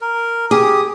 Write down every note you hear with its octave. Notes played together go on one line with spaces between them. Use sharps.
A#4
G4 G#4 D#6